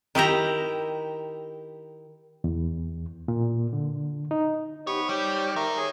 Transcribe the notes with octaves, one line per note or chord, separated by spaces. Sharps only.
D#3 E4 G4 A#5
E2
A#2
D3
D#4
B3 D#4 G4 C5 C#5
G3 G4 C#5
D#3 A#4 E5 A#5
G#4 C#5 D#6